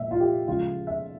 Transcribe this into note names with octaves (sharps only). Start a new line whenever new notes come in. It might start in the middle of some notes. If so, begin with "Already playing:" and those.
Already playing: A#2 F3 G#3 E5
F4
G4
C#3 F3 G#3 F4
E5